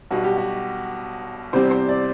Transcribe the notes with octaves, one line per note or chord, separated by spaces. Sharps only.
B1 B2 G3 F#4
G4
F#4
E2 C3 G3 C4 C5
C5
D5